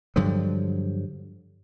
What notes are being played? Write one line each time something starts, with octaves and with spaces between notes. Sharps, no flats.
G2 D3 F3 F#3